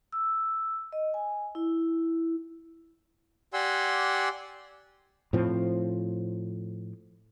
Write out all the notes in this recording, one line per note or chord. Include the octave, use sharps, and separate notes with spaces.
E6
D#5
G#5
E4
G4 D5 F#5 G#5 C6 E6
A2 F3 C4